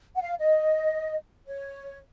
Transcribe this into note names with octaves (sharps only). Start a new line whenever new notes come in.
F#5
F5
D#5
C#5